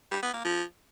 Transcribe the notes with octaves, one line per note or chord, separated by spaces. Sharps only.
G3
B3
A#3
F3